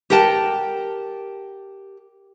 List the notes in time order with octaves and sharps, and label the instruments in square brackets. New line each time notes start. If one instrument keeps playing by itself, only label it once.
[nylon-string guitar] G4 A#4 F#5 G5 A5